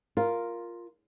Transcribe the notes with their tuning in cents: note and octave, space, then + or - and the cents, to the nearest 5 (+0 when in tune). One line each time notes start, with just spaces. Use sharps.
F4 +0 A#4 +0